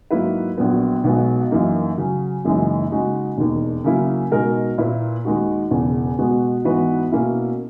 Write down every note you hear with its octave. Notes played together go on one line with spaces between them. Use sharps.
G#2 F#3 A#3 E4 B4
A#1 A#2 F#3 B3
B1 B2 G#3 B3
F#2 E3 A#3 D#4
C#3 F#3 C#4
F#1 F#2 E3 G#3 D#4
C#3 G#3 D#4 F#4
E1 D#2 D#3
C#3 F#3 A#3 C#4 E4
B2 G#3 D#4 A#4
A#2 A#3 E4 B4
D#2 D#3 G#3 D#4 F#4
E1 E2 C#3
B2 G#3 B3 F#4
G#2 E3 B3 F#4 B4
B2 A#3 C#4 E4